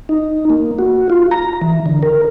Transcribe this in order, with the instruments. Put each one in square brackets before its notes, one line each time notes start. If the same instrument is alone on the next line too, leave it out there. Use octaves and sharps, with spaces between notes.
[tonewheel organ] D#4
A#3
F#4
F4
A#5
E3
D3
A#4